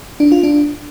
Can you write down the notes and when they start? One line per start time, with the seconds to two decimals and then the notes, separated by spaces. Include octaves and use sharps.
0.20 D4
0.32 F4
0.43 D4